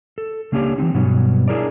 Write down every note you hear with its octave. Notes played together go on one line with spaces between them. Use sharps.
A4
C#3 A#3 C#4 D4 G4 C#5
E3 F3 C4 D#4
G2 B2 F#3 B3 C#4
D4 E4 G#4 A#4 C#5 D5